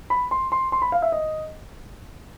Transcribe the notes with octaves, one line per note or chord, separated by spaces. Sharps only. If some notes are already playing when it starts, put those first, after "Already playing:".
B5
C6
C6
C6
B5
F5
E5
D#5